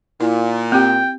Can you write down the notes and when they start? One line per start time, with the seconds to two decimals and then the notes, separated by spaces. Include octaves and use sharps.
0.20 A#2 E4
0.72 C4 G4 G5